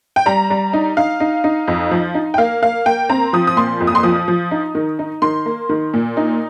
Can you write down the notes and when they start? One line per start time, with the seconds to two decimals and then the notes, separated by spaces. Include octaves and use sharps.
0.16 G5
0.26 G3 A#5
0.50 G3
0.73 D#4
0.97 D#4 F5
1.20 D#4
1.44 D#4
1.68 F2
1.91 F3
2.14 D#4
2.34 G5
2.38 A#3 F5
2.62 A#3 F5
2.86 A#3 G5
3.09 C4 A#5
3.33 F3 D#6
3.47 D#6
3.57 A#2 C6
3.80 F2
3.87 D#6
3.95 C6
4.03 F3 D#6
4.28 F3
4.51 D#4
4.75 D#3
4.99 D#4
5.22 D#3 C6
5.46 A#3
5.69 D#3
5.94 A#2
6.17 D#4